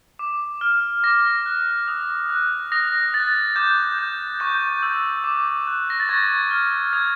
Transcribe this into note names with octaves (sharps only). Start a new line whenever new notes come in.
D6
F6
D6 A#6
F#6
D#6
F#6
D#6 A#6
F#6 A6
D6 G6
G6
C#6 G6
E6 G6
D6
F#6
A#6
A6
C#6 G#6
F6
D#6 G#6